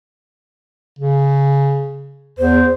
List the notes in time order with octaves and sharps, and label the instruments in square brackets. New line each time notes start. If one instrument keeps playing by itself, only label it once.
[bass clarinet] C#3
[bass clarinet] E2 [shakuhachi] C5